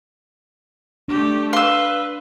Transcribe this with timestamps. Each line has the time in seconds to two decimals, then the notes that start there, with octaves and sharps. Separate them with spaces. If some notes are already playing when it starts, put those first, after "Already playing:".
1.08 A3 D4 G4
1.53 B4 F5 C6 E6